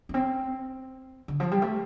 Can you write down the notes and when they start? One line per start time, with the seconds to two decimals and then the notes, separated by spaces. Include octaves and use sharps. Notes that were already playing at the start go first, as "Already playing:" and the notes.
0.09 A3
0.14 C4
1.28 D3
1.40 F3
1.51 G3
1.62 A3